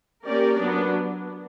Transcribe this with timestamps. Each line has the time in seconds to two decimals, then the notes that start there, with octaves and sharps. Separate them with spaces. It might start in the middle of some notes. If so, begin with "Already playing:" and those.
0.25 A#3 C#4 G4 A#4 D5
0.58 F#3 B3 D4